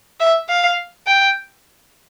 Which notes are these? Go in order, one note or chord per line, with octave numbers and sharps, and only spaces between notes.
E5
F5
G5